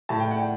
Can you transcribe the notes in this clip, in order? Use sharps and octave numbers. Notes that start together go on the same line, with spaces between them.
A2 A5
G5
F#5
G5